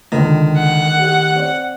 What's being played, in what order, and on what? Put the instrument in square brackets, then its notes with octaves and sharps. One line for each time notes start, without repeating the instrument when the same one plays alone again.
[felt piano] C#2 D3 [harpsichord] D#3
[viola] F#5
[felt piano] G4
C4 D5